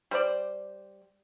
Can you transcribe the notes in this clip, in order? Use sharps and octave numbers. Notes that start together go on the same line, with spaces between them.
G3 C5 D5